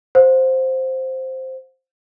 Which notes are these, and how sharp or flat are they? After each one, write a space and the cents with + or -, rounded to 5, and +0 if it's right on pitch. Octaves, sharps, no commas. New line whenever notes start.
C5 +0 F#5 -45